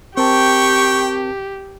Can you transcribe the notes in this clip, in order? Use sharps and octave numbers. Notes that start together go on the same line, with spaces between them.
C4 G4 A#4 G5 A5 C#6